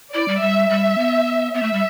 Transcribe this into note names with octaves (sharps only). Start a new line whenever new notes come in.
E4 D5
G3
G3 E5
G3 E5
B3
B3 E5
A3
G3